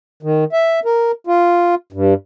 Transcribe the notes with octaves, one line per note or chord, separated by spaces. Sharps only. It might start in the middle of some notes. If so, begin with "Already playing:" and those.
D#3
E5
A#4
F4
G2